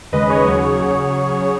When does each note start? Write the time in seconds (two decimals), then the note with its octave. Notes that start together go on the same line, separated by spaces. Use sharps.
0.12 D#2 C#3 G#3 B4 D#5
0.30 G#4 C#5
0.46 D#2 C#3 F#3
0.80 C#3 F#3